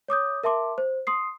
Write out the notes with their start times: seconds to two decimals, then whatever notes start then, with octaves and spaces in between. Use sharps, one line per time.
0.08 C#5 D6 D#6 G6
0.43 A#4 E5 A5 C6 D6
0.78 C5
1.07 C6 D#6 C7